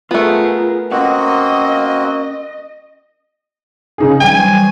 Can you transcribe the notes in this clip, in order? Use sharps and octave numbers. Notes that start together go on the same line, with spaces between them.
A3 B3 F4 G#4 A#4
A#3 C4 C#4 F#4 A#4 D#5 F#5
C#3 D#4 G#4
E3 F#3 G3 G5 G#5
C5 C#6